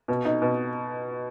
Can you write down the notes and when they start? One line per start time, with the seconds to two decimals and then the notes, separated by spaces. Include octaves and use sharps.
0.08 B2
0.25 D#4
0.42 B2